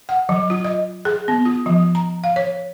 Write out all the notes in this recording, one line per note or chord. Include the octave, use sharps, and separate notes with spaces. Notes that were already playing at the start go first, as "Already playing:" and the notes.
F#5
F#3
F4
D#5
G#4
B3
F4
F3
A#5
F5
C#5